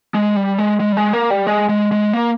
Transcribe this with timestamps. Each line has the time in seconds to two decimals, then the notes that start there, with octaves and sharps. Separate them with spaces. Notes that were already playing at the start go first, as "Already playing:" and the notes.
0.14 G#3
0.36 G3
0.59 G#3
0.80 G#3
0.92 G3
0.97 G#3
1.13 A#3
1.30 G3
1.47 G#3
1.69 G#3
1.92 G#3
2.13 A#3